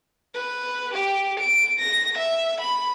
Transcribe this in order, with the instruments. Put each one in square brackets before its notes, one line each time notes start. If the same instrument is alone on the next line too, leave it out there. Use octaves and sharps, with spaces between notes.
[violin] B4
G4
D7
A#6
E5
B5